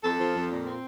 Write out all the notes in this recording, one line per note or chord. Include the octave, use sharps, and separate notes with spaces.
F2 A4
F3
F2
A#2
C4